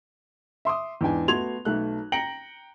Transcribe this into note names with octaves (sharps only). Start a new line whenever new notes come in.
E5 C6 D6 D#6
E2 G#2 D4 G5 G#5
A3 B3 F#4 C6 G#6 F7
B1 A3 F#6
G5 A#5 A#6 C#7 D7 F#7